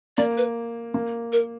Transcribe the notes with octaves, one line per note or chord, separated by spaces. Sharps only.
A#3 D5
B4
A#3
A#4